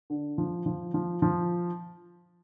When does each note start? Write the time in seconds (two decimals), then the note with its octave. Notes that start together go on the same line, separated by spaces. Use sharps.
0.10 D3
0.38 F3
0.66 F3
0.94 F3
1.22 F3